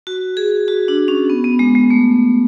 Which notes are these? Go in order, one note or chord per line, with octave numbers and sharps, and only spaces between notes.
F#4
G#4
F#4
D4
C#4
B3
B3
G#3
G#3
A3